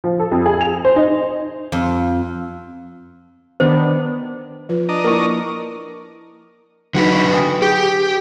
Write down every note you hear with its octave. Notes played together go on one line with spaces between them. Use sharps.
F3
A4
F2
G#4
F7
C5
D#4
F2
D#3 B3 D4 C5
F3 F4 B4
D4 D#5 A#5
A#3 E4 A#4 C#6
D3 F#3 D#4 F#4 B4
C#6
G5 G#5 D#6
G4 G#4 G6